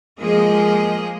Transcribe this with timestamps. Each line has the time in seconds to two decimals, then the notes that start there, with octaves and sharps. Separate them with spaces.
0.20 F3 G#3 A#3 G#4 D#5